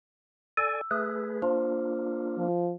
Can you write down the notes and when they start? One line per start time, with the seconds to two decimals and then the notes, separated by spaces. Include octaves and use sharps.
0.57 A4 D5 G#5 E6
0.91 A3 G#4 B4
1.42 A#3 D4 F4 C5
2.38 F3